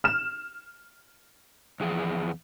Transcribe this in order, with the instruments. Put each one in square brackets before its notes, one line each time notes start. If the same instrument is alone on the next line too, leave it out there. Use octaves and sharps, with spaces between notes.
[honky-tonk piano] F6 E7
[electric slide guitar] E2 F3 G#4